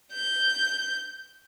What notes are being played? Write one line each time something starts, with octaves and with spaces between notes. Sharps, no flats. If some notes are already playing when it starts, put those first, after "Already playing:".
G6